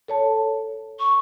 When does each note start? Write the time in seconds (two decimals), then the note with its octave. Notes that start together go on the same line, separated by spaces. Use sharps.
0.08 A4 C#5 A5
1.00 C#6